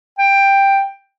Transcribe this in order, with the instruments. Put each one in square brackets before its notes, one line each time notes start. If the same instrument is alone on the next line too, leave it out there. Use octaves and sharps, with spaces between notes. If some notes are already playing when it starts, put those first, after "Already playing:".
[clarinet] G5